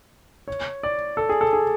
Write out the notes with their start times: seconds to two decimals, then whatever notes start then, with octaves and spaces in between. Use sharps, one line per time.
0.48 C#5
0.83 D5
1.17 A4
1.29 G#4
1.41 A4
1.53 G#4